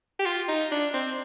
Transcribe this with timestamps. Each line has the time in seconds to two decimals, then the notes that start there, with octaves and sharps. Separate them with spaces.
0.19 G4
0.26 F4
0.48 D#4
0.71 D4
0.94 C4